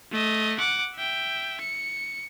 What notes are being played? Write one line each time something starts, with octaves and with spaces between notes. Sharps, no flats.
A3 D#5
F#5 D6
E5 G5
C#7